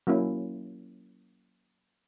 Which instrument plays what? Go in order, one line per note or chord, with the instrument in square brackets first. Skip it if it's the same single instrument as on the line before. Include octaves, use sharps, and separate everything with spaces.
[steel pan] F#3 A#3 C#4 E4